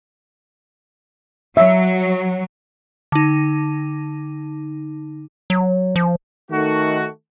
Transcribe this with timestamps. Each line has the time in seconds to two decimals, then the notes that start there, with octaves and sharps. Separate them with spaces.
1.57 F#3 E5
3.12 D3 D#4
5.50 F#3
5.96 F3
6.51 D#3 A3 F#4